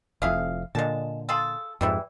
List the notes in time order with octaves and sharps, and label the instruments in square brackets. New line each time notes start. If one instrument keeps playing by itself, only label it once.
[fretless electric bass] F1 F2 [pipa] E4 G#4 F5
[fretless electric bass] A#2 D3 [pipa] G#3 A5
[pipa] F4 G#4 A4
[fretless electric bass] F2 G#2 [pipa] E3 G3 E4